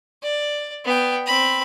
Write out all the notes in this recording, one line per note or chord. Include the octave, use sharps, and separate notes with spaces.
D5
B3 G5
C4 B5